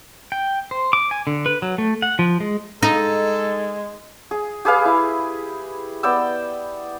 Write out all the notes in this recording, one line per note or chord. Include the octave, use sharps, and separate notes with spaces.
G5
C5
D6
G#5
D3
B4
F#3
A3
F#5
F3
G#3
G#3 D#4 A4
G#4
G4 G#4 B4 F5
E4
B3 D5 G5 E6